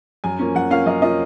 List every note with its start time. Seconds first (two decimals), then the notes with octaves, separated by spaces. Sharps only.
0.24 F#2 G#5
0.39 F3 A#3 C#4
0.55 F#2 F#5
0.71 F3 A#3 C#4 F5
0.86 F#2 D#5
1.02 F3 A#3 C#4 D#5